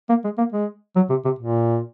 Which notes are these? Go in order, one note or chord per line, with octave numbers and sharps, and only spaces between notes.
A#3
G#3
A#3
G#3
F#3
C3
C3
A#2